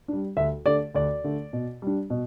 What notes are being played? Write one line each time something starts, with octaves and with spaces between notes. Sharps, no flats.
G3 D4
D2 E5
D3 A3 D5
D2 D5
D3 A3
B2
G3 D4
B2